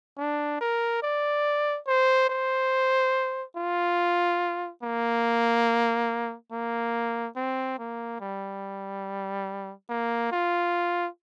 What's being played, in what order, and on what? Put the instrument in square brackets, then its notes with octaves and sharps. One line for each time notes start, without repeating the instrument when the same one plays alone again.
[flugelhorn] D4
A#4
D5
C5
C5
F4
A#3
A#3
C4
A#3
G3
A#3
F4